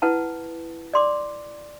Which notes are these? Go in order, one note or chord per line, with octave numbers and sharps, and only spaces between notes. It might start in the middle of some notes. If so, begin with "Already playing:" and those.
E4 B4 F#5 A5
D5 C6 D6